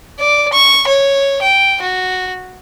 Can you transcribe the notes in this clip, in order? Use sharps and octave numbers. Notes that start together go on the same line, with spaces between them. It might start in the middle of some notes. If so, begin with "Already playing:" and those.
D5
C#6
C#5
G5
F#4